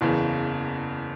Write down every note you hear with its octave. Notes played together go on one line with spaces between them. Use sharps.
F#1 E2 C#3 E3